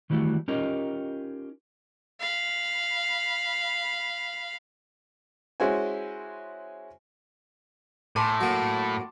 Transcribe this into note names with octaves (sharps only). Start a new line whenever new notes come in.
D#3 E3 G3 A3 F#4
C#4 D#4 F4 G4 A#4 D#5
F5 B5
G#3 C#4 E4 F#4 C5 G#5
A2 G#5 A5 C6 D6
F#3 A#3